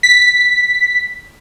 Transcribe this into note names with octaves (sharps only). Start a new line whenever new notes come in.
B6